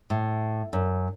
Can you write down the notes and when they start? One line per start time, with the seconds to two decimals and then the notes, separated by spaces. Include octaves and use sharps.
0.10 A2
0.73 F#2